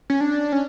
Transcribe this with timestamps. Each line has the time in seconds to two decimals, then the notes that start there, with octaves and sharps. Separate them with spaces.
0.10 C#4
0.21 D4
0.52 C#4